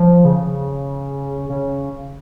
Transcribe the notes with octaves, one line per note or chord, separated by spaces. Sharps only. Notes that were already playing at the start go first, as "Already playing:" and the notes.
Already playing: F3
C#3
C#3